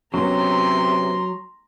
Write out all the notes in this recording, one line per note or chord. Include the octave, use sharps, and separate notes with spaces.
C3 F#3 B3 C#4 A#5 C6